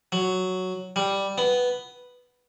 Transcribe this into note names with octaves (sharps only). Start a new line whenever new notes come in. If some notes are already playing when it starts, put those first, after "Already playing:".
F#3
G3
B3